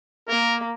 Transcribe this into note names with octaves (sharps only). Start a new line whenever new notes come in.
A#3 A#4